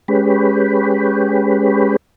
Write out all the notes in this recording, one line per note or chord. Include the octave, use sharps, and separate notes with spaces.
G#3 C#4 G4 B4